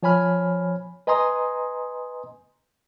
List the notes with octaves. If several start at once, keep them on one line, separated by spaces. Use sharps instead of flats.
F3 C#5 G#5 B5 F6
B4 D#5 G#5 A#5 C6 D#6